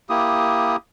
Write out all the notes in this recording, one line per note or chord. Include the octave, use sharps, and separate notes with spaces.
A#3 E4 G4 D#6